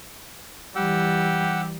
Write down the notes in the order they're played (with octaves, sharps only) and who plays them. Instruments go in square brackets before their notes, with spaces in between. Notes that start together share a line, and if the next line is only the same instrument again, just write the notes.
[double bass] E3 G3 [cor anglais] G4 [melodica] F#5 E6